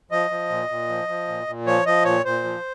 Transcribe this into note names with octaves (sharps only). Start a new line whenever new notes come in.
F3 D#5
F3
A#2
A#2
F3
F3
A#2
A#2
F3 C#5
F3 D#5
A#2 C#5
A#2 C5
F3